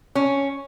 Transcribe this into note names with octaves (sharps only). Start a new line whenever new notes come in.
C#4